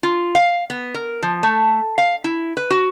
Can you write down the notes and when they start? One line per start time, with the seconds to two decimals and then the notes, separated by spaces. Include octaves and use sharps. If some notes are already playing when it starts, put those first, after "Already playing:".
0.03 F4
0.35 F5
0.70 B3
0.94 A#4
1.22 F3
1.43 A3
1.98 F5
2.24 E4
2.57 B4
2.70 F#4